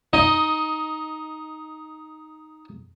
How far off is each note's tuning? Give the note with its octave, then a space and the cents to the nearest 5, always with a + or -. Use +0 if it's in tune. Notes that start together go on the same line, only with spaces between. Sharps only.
D#4 +0 D#5 +15